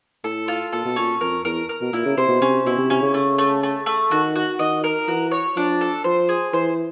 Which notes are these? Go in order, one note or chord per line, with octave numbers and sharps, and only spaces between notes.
A2 A4
F4
A#2 A4
B2
A#2 C#4
F2 A#4
E2 A#4
A#4
B2
A#2 E4
C#3
C3 C5
B2
C3 C#4
B2 E4
C3
C3 C#4
C#3
A3
A3
A3
A3
D#3 F#4
F#4
D#3 D#5
A#4
E3 F#4
C#5
F3 D4
A4
F3 C5
G#4
E3 C5